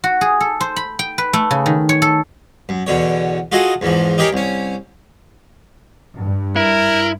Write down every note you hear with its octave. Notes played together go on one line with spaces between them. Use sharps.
F#4
G#4
A4
C5
B5
G5
B4
A3
C#3
D#3
C#5
A4
F#2
E2 B2 D3 C#5
F4 F#4 G#4 A4 D#5
E2 G#2 E3 F3
D#4 G4 G#4 A#4 C#5
C2 C#4
G2
E4 A#4